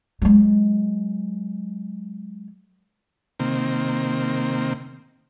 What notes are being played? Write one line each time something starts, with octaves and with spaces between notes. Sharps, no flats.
F#3 G#3
C3 D#3 A#3 C4